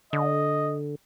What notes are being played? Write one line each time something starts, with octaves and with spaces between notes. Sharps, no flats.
D3 D#5